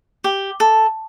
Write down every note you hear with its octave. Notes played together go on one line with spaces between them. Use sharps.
G4
A4